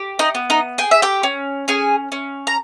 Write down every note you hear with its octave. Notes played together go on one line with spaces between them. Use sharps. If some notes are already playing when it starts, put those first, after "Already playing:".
Already playing: G4
D#4 D#5
B3
D#4 D#5
G#4 G5
E5
G4 G5
C#4
C#4 G#4 G#5
C#4
A#5